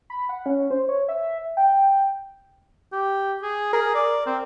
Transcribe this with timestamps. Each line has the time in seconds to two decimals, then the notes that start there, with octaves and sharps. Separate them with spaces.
0.10 B5
0.29 F#5
0.46 C#4
0.71 C5
0.89 C#5
1.08 E5
1.57 G5
2.92 G4
3.42 G#4
3.73 G#4 A#4
3.95 D5
4.26 C4